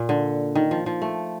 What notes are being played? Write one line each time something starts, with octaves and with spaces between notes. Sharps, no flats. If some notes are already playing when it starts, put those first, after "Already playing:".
Already playing: A#2
D3
D#3
F3
F3
A3